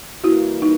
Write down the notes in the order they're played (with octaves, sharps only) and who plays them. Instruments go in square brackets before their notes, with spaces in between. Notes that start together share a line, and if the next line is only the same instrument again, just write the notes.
[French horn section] E3 G3 A#3 [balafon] E4 F#4
[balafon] D#4